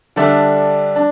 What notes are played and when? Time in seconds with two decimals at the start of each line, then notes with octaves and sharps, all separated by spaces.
0.16 D3 G3 D4 A4 E5
0.96 D4